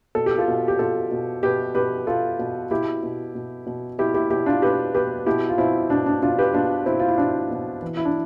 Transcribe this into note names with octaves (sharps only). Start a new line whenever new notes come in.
B2 A4
G4
F4 A4
B2
G4
B2 F4 A4
B2
B2 G4 B4
B2 G4 B4
B2 F4 A4
B2
B2 E4 G4
B2
B2
B2
B2 E4 G4
E4 G4
B2 E4 G4
D4 F4
B2 G4 B4
B2 G4 B4
B2 E4 G4
F4
B2 C4 E4
B2 D4
D4
B2 D4 F4
G4 B4
B2 D4 F4
B2 C4 E4
F4
E4
B2 D4
B2
E3
E4
D4